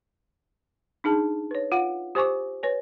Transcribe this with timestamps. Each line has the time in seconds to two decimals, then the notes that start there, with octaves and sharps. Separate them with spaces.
1.04 D4 D#4 G#4 A5
1.51 B4 C#5
1.72 F4 F5 F#5
2.15 G4 C5 G#5 C#6 D6
2.63 B4 C#5 G#5